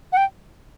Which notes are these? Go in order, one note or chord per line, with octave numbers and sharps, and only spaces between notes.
F#5
G5